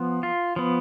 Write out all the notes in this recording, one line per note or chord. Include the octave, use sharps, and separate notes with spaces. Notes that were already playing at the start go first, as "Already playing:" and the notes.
Already playing: F3 B3
F4
F3 B3